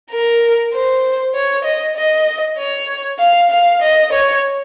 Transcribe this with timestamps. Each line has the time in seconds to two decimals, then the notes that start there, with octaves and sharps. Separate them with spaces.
0.11 A#4
0.73 C5
1.35 C#5
1.65 D#5
1.97 D#5
2.58 C#5
3.19 F5
3.50 F5
3.82 D#5
4.12 C#5